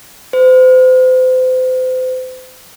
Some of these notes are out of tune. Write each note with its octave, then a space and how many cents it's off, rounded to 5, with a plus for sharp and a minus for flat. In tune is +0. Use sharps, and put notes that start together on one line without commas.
C5 -35